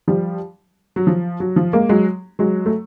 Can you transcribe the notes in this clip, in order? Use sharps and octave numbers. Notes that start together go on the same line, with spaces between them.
F3 G3
F#3
F3
F#3
F3
G#3 A#3
F#3 G#3
F#3 G#3
A3